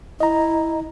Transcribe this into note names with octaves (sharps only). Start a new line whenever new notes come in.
E4 D#5 A#5